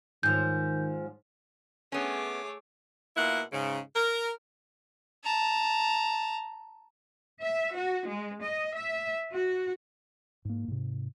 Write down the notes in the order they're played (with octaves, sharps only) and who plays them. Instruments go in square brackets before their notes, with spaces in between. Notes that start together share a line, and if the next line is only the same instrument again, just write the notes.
[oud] G#2 F3 [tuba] D#3 [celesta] G6
[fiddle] A3 C#5 [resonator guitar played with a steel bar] B3 C#4 [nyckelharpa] G#4 D6
[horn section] B2 A#3 E4 F4 F#5
G#2 C#3
A#4
[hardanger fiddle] A5 A#5
[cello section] E5
F#4
G#3
D#5
E5
F#4
[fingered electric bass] G#2 A#3
G#2 C3